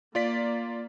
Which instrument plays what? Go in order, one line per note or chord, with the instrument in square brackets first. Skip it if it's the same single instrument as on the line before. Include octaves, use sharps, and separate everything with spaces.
[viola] A#3 [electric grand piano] F4 D5 B6